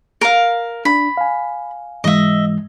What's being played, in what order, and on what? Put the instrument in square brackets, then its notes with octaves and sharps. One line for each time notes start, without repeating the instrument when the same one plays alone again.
[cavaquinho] A#4 F5
[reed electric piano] D4 [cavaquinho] B5
[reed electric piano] F5 G#5
[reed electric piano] G#2 E3 G#3 [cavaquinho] D#5 E5